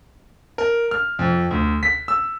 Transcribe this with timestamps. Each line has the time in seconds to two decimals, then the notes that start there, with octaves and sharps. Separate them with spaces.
0.58 A#4
0.91 F6
1.19 F2
1.51 D2
1.83 B6
2.08 E6